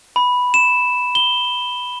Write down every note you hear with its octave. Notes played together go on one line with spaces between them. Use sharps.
B5
E7
G7